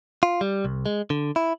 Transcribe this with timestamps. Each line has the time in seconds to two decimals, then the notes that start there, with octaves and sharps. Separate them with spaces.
0.23 F4
0.41 G3
0.65 C2
0.86 G#3
1.10 D3
1.36 E4